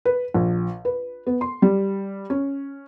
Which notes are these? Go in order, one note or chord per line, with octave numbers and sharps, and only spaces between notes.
B4
A#1
B4
B3
C6
G3
C#4